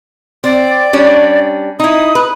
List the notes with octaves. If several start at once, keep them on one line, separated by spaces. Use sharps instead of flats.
C4 D5
G3 C#4 D4
D#4 E4 D#6
B4